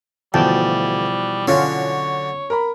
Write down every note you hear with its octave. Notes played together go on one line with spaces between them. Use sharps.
D2 B2 E3 F3 G3 G5 A5
D3 F#3 C#4 F4 C#5
A#4 A#5 B5